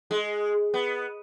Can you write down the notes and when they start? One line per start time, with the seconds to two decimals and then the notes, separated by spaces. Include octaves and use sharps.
0.11 G#3
0.74 B3